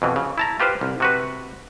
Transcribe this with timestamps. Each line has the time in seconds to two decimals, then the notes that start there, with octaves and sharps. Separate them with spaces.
0.02 F2 B2 E3
0.16 C#3
0.38 E4 A5 A#5
0.60 F4 G4 B4 C5 F5
0.81 C2
1.00 C3 F#4 B4